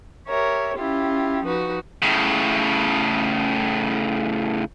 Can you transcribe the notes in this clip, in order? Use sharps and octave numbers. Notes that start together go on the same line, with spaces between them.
G4 A#4 C#5 E5
C#4 E4 F4 G4
F3 D#4 F#4 B4
A2 C#3